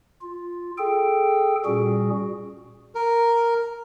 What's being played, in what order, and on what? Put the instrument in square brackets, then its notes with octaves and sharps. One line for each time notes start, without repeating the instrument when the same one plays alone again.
[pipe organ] F4
G#4 A4 G5
A#2 G3 C#4 F#4 G#4
[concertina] A#4